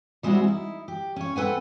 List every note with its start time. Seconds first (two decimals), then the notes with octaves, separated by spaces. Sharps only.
0.23 G3 G#3 C4 E4 F#4
0.44 D#4 E4
0.88 G4
1.16 C#4 C#5
1.36 C4 A4 B4 F#5 G#5